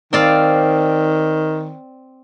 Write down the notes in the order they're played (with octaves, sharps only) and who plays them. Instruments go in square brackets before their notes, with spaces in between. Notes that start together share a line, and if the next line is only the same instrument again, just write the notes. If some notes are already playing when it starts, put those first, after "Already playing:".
[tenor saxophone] D#3 [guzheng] C4 D5 F5